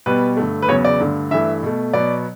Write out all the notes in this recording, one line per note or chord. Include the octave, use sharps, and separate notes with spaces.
B2 G3 B3 B4
G2 D3 A3
B4
E2 C#3 F#3 B3 C#5
D5
G2 D3 A3
G2 E3 A3 E5
B2 A3
B2 F#3 B3 D5